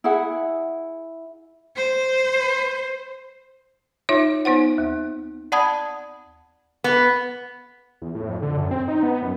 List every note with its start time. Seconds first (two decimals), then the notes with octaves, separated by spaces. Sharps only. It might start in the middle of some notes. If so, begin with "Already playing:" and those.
0.04 E4 G#4 E5 F#5
1.76 C5
4.09 D#4 F4 C#5 E5
4.45 B3 D#4 C5 F#5
4.78 D#2
5.52 D5 F#5 A5 B5 D#6 G#6
6.84 B3
8.02 E2
8.15 A2
8.29 F2
8.42 D3
8.57 F#2
8.71 C4
8.88 D#4
9.03 B3
9.22 F#2